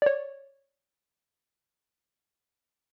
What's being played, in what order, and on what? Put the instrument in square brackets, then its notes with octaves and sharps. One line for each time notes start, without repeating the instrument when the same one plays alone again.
[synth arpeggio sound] C#5 D5